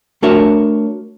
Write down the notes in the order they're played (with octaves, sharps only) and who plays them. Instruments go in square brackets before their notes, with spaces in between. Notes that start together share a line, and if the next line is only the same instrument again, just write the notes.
[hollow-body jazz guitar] A3 D4 F#4 A#4 C#5 E5